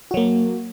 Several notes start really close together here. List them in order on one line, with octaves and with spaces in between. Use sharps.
F#4 F#3 A#3